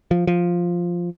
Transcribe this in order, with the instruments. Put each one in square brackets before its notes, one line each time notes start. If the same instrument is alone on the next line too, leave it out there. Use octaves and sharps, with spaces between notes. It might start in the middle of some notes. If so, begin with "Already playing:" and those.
[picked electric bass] F3
F3